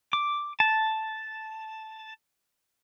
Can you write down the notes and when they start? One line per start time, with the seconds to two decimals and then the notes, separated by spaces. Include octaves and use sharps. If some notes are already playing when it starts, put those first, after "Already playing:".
0.13 D6
0.60 A5